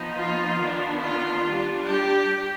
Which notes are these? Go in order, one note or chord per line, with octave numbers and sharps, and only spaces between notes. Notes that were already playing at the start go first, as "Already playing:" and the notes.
Already playing: F3 B3 D#4
F4
D#3 B3 D4
F4
G3 D4
G4